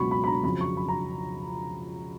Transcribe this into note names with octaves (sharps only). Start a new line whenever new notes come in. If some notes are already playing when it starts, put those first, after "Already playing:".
Already playing: C#2 B2 F#3 B5 C#6
B5
B5
A#5
F2 C#3 F#3 B5
C#6
B5
A#5